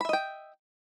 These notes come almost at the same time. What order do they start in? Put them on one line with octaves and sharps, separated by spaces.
B5 E5 D#5 G5